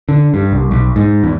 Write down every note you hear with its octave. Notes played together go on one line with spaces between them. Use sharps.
D3
G2
C2
B1
G#2
E2